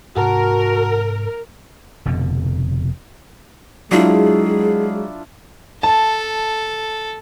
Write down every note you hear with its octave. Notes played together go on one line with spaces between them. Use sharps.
G#2 C3 F#4 A#4 F#5 A5 A#5
F1 F2 B2 D3
F#3 G#3 D4 E4 F4 G#4
A4 A5